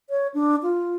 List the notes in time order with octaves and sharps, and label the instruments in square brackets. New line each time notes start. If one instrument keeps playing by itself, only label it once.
[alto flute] C#5
D4
F4